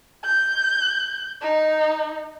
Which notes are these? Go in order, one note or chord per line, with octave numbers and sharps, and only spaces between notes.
G6
D#4